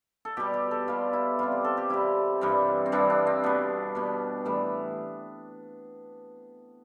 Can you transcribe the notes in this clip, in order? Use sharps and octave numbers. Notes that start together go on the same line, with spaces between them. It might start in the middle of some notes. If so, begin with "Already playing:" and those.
A4
B2 G3 G4
G4
A4
B2 G3 F4
E4
C3 G3 F4
G4
A4
G4
C3 G3 E4
G2 E3 G3
C4
G2 E3 G3 D4
D4
C4
B2 G3 B3
B2 G3
A2 E3 G3